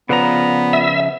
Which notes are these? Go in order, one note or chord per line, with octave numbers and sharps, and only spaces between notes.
C#3 F3 B3 F4 B4 D5 A#5
E5